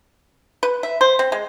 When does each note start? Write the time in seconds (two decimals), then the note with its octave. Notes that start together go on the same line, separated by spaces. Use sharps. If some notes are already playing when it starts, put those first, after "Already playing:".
0.63 B4
0.83 E5
1.01 C5
1.19 C4
1.32 G#3